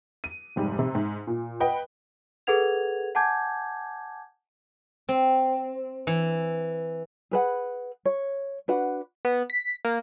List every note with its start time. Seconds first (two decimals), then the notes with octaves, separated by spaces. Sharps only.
0.24 D#7
0.56 F1 G#2 G3
0.79 C3
0.95 G#2
1.27 A#2
1.60 B4 D#5 F#5 G5
2.47 G#4 A4 B4 F#5 G#6 F7
3.15 F#5 G#5 A5 D6 G6 G#6
5.09 C4
6.07 E3
7.31 G#4 B4 F#5
8.05 C#5
8.68 D4 F#4 B4 F#5
9.25 B3
9.50 B6
9.85 A#3